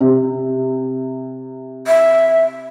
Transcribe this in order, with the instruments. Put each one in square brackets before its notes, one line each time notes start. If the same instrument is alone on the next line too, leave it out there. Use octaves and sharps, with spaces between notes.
[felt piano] C3
[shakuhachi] E5